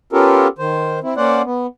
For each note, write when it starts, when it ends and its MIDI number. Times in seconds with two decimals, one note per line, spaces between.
0.13 0.47 59
0.13 0.47 61
0.13 0.47 65
0.13 0.47 67
0.13 0.47 69
0.13 0.47 70
0.58 0.99 51
0.58 0.99 72
1.03 1.14 60
1.03 1.14 64
1.17 1.42 58
1.17 1.42 61
1.17 1.42 72
1.17 1.42 74
1.17 1.42 78
1.45 1.67 59